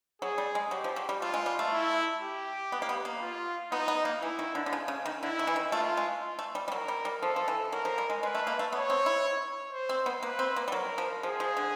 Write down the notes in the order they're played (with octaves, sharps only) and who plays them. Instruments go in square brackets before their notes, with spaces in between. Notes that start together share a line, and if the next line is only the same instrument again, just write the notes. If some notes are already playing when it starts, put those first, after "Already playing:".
[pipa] F#3 [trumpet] G#4
[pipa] G3
G#3
[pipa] F#3 [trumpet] G4
[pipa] F3
F#3
G3
[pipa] A3 [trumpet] F4
[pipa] G#3
G3
A3
[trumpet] E4
G4
[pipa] B3
A#3
B3
A#3
[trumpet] F4
[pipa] B3 [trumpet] D#4
[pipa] B3
A#3
[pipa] E3 [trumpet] E4
[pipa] D#3
D3
D3
C#3
C#3
D#3
[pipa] D3 [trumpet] E4
[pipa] D#3
E3
D#3
[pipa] A3 [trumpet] F4
[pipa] G#3
A3
G3
G3
[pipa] F#3 [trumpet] A#4
[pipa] G3
G3
[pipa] F3 [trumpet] A4
[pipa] F3
E3
[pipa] F#3 [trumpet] A#4
[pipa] F3
G3
G#3
[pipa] G#3 [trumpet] B4
[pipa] A3
A#3
A3
[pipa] B3 [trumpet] C#5
[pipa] C4
E4
[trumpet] C5
[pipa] C4
B3
[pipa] A#3 [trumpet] B4
[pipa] C4
A#3
G3
[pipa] F#3 [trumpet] A#4
[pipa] F3
[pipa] F3 [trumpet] G#4
[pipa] F3
D3